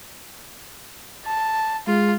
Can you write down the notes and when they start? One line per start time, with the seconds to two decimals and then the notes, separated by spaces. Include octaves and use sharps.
1.26 A5
1.87 G#3 F4